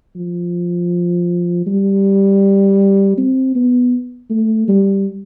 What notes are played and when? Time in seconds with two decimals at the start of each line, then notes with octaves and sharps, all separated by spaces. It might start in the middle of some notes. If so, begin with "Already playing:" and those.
0.16 F3
1.66 G3
3.18 C4
3.55 B3
4.30 A3
4.68 G3